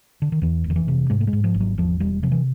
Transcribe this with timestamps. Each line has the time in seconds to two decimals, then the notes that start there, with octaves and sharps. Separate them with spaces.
0.22 D3
0.32 D#3
0.42 E2 E3
0.64 F1
0.70 D#3
0.76 E3
0.88 C3
1.10 G#2 G#3
1.20 A3
1.27 G#3
1.33 G#2
1.44 F3
1.54 G#1
1.60 F#3
1.78 E2 F3
2.00 E1 G3
2.23 C3 F3
2.32 E3